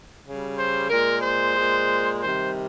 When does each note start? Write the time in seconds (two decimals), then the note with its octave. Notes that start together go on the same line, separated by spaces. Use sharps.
0.24 C#3 G3
0.57 C5
0.89 A#2 G#3 A#4
1.22 C5
1.56 A#2 G#3
2.21 C3 D#3 G3 C5